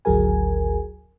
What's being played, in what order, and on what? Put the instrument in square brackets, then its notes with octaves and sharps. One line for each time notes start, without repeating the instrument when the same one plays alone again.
[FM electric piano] G#1 D2 F#3 G#4 A#4 G#5